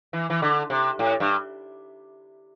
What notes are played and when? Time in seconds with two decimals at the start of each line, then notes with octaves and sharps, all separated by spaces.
0.13 E3
0.30 E3
0.42 D3
0.70 C3
0.99 A2
1.20 G2